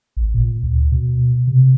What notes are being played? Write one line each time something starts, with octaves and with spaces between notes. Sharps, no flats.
A1
A#2
D2
B2
C3